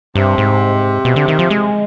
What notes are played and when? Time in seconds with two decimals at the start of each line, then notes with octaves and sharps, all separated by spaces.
0.15 G2 C3
0.38 G#2
1.05 B2
1.16 D3
1.28 D#3
1.39 F3
1.50 G#3